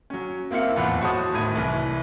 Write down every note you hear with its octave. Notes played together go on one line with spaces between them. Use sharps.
F#3 C#4
A#3 C4 E4 F5 C#7
D#1 E2 A2 F3 F#5
F#4 C5 C#5 A5 D#6
D1 G#1 A2 G#6 D#7
C2 E3